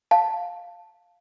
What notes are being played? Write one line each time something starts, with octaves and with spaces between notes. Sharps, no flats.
F5 A5